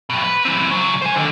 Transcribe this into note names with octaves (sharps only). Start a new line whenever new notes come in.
F2 B2
B4
E3 C4
C#2 F#3
C5 G#5
D3 D#3